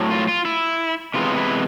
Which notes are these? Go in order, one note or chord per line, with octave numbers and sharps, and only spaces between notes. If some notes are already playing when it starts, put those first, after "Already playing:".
Already playing: A2 F#3
F4
F4
E4
C3 E3 G#3 B3 F4
E4